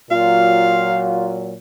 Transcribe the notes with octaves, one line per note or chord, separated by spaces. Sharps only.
A#2 F#3 F4 F5